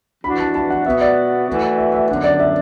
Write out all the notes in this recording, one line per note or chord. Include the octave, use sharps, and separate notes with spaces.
E3 D4 F#4 B5
A5
A5
F#5
B2 B3 F#4 E5
D5
E3 A3 F#4
E5
E5
F#2 D3 B3 D4 F#5
D5
E5